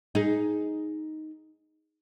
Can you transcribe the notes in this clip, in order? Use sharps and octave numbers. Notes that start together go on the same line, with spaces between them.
D#4 G#4